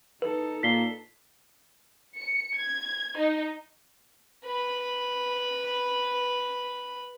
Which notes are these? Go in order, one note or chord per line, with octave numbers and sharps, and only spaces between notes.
D#4 A4 B4
A#2 B6 C7 G7
C#7
G#6
D#4
B4 B5